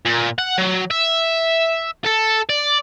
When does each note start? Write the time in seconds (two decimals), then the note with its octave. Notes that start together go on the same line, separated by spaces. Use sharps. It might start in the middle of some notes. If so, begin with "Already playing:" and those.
0.05 A#2
0.38 F#5
0.58 F#3
0.91 E5
2.05 A4
2.49 D5